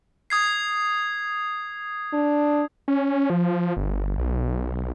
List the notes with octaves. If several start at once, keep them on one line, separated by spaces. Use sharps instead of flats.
D#6 G#6 C7
D4
C#4
F3
G1
B1